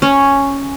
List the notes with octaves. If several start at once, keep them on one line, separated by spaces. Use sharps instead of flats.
C#4